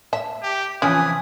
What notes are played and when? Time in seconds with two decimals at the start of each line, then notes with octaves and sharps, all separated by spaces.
0.13 E5 A5
0.43 G4
0.82 C3 E3 F3 C#4 B4 G#5 D#6